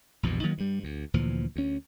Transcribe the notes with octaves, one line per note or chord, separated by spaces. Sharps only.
A#1 E2 G2 B2
D#3 F#3 A#3
G2 G3
D2
D2 A#2 E3 F3
D2 C#4